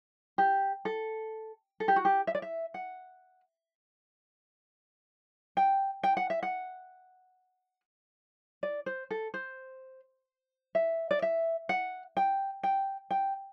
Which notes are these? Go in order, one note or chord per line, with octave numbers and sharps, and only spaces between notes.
G4
A4
A4
G4
F#4
G4
E5
D5
E5
F#5
G5
G5
F#5
E5
F#5
D5
C5
A4
C5
E5
D5
E5
F#5
G5
G5
G5